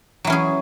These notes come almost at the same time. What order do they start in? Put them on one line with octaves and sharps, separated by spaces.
F#3 E3 C#4 G#4